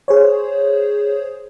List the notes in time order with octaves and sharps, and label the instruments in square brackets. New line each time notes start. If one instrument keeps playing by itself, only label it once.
[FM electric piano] G#4 C5 C#5